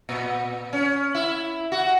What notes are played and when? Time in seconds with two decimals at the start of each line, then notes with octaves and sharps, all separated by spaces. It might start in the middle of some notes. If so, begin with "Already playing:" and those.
0.09 A#2
0.73 C#4
1.15 E4
1.72 F#4